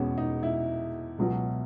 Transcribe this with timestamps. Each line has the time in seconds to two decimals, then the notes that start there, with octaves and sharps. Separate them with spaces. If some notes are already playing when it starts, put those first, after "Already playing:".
Already playing: E2 B2 G#3 B3 C#4
0.18 D#4
0.43 E4
1.18 C#2 B2 F#3